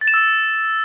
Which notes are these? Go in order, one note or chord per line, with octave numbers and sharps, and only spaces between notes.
A6
E7
E6